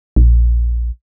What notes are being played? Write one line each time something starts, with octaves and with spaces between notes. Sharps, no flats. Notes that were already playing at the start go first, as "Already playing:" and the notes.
A#1